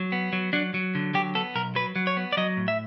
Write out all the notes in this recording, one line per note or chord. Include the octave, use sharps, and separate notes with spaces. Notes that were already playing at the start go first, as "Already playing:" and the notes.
Already playing: F#3
B3
F#3
F#3 D4
F#3
D3
F#3 G4
B3 A4
B1 A#4
F#3 B4
F#3
C#5
B3
D5
F#3 D#5
A2
E5